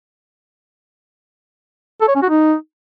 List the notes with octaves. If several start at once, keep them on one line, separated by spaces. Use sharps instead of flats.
A4
C#5
C#4
F#4
D#4